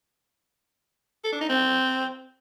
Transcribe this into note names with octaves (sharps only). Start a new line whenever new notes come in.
A4
D4
D#4
C4